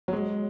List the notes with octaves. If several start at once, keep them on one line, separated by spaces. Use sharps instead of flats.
F#3
G#3